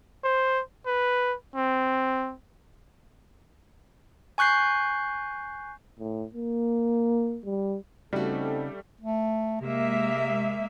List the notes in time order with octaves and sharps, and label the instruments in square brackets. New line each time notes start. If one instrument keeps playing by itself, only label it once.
[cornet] C5
B4
C4
[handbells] G#5 C#6 F#6 G6 C7
[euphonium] A2
A#3
G3
[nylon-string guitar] C#3 F#4 [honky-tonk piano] G3 A3 [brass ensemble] C4 D#4 A4
[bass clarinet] A3
[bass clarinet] C3 [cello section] G#3 A#3 E5